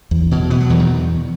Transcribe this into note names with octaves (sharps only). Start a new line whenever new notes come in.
E2
B2
B2 B3
F#3
E2 E3
D#3